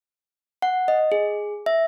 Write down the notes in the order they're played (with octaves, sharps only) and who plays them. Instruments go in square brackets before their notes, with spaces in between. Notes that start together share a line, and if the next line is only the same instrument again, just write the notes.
[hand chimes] F#5
D#5
G#4
E5